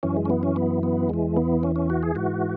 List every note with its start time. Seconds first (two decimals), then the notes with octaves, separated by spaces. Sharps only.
0.03 F#2 E3 C#4
0.17 G#3
0.25 C#4
0.30 B3
0.43 C#4
0.56 B3
0.83 B3
1.09 E2 E3 G#3
1.37 B3
1.63 C#4
1.76 C#4
1.90 F#4
2.03 G#4
2.15 G#2 E3 F#4